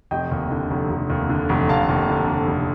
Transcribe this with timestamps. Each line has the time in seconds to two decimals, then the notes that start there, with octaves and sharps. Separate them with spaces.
0.11 F1 D#5 G5
0.31 D#2
0.51 D3
0.70 F1
0.90 F1
1.10 D#2
1.29 D3
1.49 F1
1.69 F1 F5 A5
1.89 D#2
2.09 D3
2.27 F1
2.47 F1